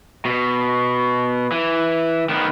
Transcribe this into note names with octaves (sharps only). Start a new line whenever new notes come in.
B2
E3
D#3 B3